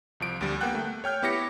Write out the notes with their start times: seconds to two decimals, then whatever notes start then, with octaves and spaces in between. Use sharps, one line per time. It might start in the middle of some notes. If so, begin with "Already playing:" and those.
0.20 C2 F3 D7
0.41 D2 G3
0.61 A#3 B3 F#5 G5 F#6
0.75 A3
1.04 C#5 G5 F6 G6
1.22 B3 E4 G4 C#5 A#6 C#7